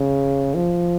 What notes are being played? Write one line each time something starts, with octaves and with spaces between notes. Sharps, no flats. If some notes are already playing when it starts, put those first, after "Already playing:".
Already playing: C#3
F3